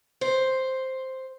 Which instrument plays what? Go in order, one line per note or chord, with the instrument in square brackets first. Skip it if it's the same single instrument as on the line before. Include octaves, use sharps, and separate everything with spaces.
[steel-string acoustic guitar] C5